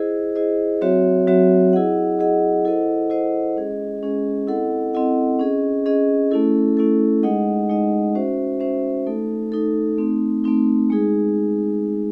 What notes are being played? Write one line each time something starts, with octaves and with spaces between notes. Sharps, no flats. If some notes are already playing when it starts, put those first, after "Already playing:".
Already playing: E4 G#4 C5 D#5
E4 G#4 C5 D#5
F#3 C4 F#4 C#5 E5
F#3 C4 F#4 C#5 E5
E4 G#4 D#5 F#5
E4 G#4 D#5 F#5
E4 A4 C5 D#5 F#5
E4 A4 C5 D#5 F#5
G#3 C#4 G#4 D#5
G#3 C#4 G#4 D#5
C4 E4 A4 D#5 F#5
C4 E4 A4 D#5 F#5
C#4 G#4 D#5
C#4 G#4 D#5
A3 C#4 E4 A4
A3 C#4 E4 A4
G#3 D#4 G#4 D#5 F#5
G#3 D#4 G#4 D#5 F#5
C#4 F#4 C5 E5
C#4 F#4 C5 E5
A3 D#4 A4
A3 D#4 A4
A3 C4 D#4
A3 C4 D#4
G#3 D#4 G#4